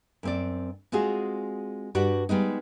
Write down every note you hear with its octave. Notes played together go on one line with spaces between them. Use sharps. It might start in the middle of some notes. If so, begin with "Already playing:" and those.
F#2 C4 D5
G#3 C4 F4 F#4 G#4
G2 F#4 G4 D5 F#5
G3 G#3 B3 D#4